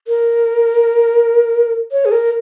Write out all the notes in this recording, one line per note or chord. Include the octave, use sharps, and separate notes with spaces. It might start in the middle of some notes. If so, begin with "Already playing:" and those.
A#4
C#5
G#4
A#4